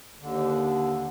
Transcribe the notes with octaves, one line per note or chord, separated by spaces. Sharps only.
D#2 D3